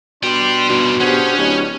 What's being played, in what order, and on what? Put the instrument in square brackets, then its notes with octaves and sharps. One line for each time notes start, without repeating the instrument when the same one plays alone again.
[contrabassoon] B2 [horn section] G3 D4 C6 [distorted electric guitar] D5 G5
[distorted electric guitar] G2 D#3 [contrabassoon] B2
[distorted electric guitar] C#4 [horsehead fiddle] D4 G4 [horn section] G#4 C5 F#5
[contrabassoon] D1 [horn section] B4 C#5 D#5